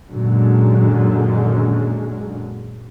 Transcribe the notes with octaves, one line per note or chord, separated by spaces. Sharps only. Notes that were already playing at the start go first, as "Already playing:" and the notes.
F#2 A#2 D3 D#3 F#3 G#3